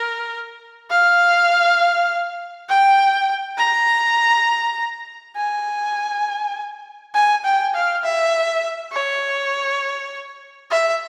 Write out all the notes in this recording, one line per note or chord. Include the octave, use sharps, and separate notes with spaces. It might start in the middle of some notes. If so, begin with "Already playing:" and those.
Already playing: A#4
F5
G5
A#5
G#5
G#5
G5
F5
E5
C#5
E5